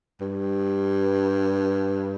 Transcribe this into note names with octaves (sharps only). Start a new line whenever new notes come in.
G2